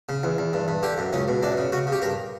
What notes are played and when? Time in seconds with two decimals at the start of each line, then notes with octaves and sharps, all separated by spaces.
0.09 C#3
0.23 E2
0.38 E2
0.53 G2
0.68 G2
0.83 D3 G4
0.98 F#2
1.13 C#2 C#4
1.28 B2
1.43 F#2 D4
1.57 C#3
1.72 C#3 F#4
1.87 C#3
1.92 G4
2.02 G2 A#4